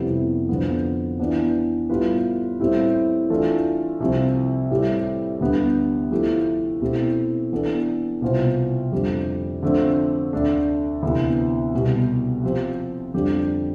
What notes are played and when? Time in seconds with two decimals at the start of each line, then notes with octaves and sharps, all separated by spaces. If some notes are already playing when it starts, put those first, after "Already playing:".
Already playing: F2 C3 G3 B3 E4
0.49 F2 D3 F3 B3
1.20 E3 B3 D4
1.90 A2 G3 B3 F4 B4
2.60 A2 G3 C4 E4
3.30 E3 A3 D4 F4 A4
4.00 C2 C3 F3 C4
4.71 A2 G3 C4
5.41 D2 D3 G3 B3 D4
6.11 F3 A3 E4 G4
6.81 B2 A3 C4 E4 G4
7.52 E3 B3 D4 A4
8.22 C2 B2 B3 F4 C5
8.92 F2 D3 G3
9.63 D3 F3 A3 C4
10.33 D2 D3 A3 D4
11.03 D2 C3 E3 B3
11.73 C2 B2 G3
12.43 F3 C4 G4 C5
13.14 F2 D3 G3 D4 G4